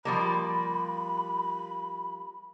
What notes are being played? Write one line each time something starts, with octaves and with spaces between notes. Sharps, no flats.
F3 G3 A#3 B5